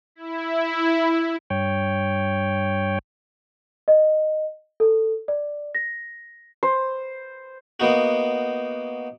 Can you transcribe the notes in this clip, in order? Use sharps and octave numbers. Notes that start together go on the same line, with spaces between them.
E4
G2 C#5 G5
D#5
A4
D5
A#6
C5
A#3 B3 D#4 F#4